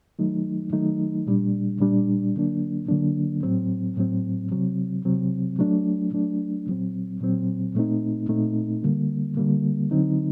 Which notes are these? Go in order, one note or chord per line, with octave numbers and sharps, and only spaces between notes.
D#3 F#3 A3 D#4
D#3 F#3 A3 D#4
A#2 G3 D4
A#2 G3 D4
D3 F#3 A#3 D4
D3 F#3 A#3 D4
A2 F#3 C4
A2 F#3 C4
C3 F#3 C4
C3 F#3 C4
F#3 A3 D4
F#3 A3 D4
A#2 F#3 C4
A#2 F#3 C4
A#2 A3 C4 D#4
A#2 A3 C4 D#4
D3 G3 A#3
D3 G3 A#3
D3 F#3 C4 D#4